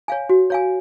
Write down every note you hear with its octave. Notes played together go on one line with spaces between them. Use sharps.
C#5 F5 G#5
F#4
C#5 F5 G#5